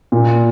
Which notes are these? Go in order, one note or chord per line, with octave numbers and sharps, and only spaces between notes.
A#2